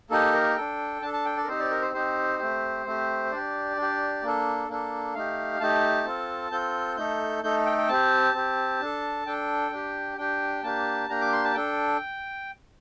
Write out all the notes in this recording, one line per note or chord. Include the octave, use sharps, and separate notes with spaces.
A#3 D#4 G4 A4
A#4
D4 A4 G5
D4 A4 A5
A5
G5
D5
A#4
C4 D#4 G4 C5
D5
A#4
C5
C4 D#4 G4 C5
A3 C4 G4
A3 C4 G4
D4 G4 D5
D4
G4
A#3 D4 A4
A#3 D4 A4
A3 D#4 G4 F5
A3 D#4 G4 A5
C4 F4 A4
C4 F4 A4 G6
A3 D#4 A4 G6
A3 D#4 A4 G6
G5
G5
C4 G4 A5
C4 G4
D4 A4
D4 A4 G5
D4 G4
D4 G4 G5
A#3 D4 G4 A5
A#3 D4 G4 A#5
D6
C6
A5
D4 A4 G5